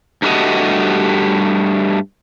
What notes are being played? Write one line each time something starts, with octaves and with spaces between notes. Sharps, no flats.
G2 F#3 G3 A3 F#4 D#5